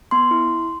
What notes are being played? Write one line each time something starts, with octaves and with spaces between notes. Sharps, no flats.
B3 C6
E4